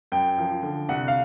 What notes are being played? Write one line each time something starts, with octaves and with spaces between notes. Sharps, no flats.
F#2 G5
F3
D3
C2 F#5
F5